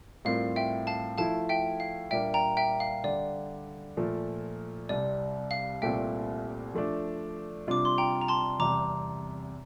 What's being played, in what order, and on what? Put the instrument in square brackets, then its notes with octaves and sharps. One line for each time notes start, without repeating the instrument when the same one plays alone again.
[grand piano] A2 G3 C4 F4 A#4 [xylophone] F5
[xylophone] E5 G5
F5 A5
[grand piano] F3 A3 E4 [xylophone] F5 A5
[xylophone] E5 G5
F5
[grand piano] A#2 G3 A#3 D4 [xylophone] E5 G5
[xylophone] G5 A#5
E5 G5
F5
[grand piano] D3 G3 D4 [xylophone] D5
[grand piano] A#2 F3 A3
[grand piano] C2 C3 G3 C4 [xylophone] D5
[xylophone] F5
[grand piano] C2 A#2 A3 C4 G4 [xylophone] E5 G5
[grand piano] F3 A3 D4
[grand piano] C3 G3 D4 F4 [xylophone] D6
[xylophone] C6
G5 A#5
A#5
A5 C6
[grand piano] E2 C3 G3 C4 [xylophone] A#5 D6